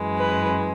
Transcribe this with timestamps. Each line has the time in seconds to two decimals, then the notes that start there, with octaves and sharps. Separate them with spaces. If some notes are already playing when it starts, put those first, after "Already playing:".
Already playing: F#2 E3 G#3
0.18 B4